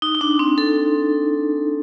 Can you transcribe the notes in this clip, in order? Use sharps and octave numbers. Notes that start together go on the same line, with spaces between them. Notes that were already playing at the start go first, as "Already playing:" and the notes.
D#4
D#4
D4
C4
A4